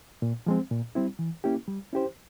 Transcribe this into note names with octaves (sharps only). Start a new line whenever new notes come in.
A#2
F3 G#3 C4
A#2
G3 C4 E4
E3
A#3 C#4 E4 G4
G3
C#4 E4 G4 C5